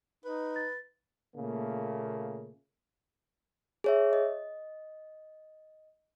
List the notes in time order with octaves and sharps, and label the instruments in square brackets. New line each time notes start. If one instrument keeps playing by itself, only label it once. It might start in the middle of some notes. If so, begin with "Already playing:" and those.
[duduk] D#4 [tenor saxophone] B4
[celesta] A6
[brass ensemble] A#2 C#3 A3 A#3
[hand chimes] G#4 C#5 E5
D#5